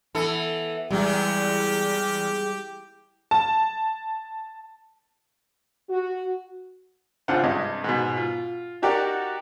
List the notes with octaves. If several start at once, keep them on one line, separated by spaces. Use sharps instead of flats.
E3 B3 A4
E2 G3 G#3 G4 G#4
A5
F#4
G#1 C#2 D4 F4 C5 F#5
G2 C3 G#3 D4 D#5
G#2 B2
F4
D#4 F#4 G4 A#4 D5 G5